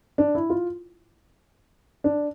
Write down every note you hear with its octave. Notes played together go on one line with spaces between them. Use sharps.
D4
E4
F4
D4